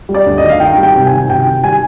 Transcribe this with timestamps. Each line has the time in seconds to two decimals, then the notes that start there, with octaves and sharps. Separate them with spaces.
0.09 G3
0.15 D5
0.26 D2
0.38 D#5
0.43 D#3
0.49 F5
0.60 D#3 G5
0.77 G3
0.83 G5
0.95 C3
1.07 G#5
1.13 D#3
1.29 C3 G5
1.46 D#3
1.63 G3 G#5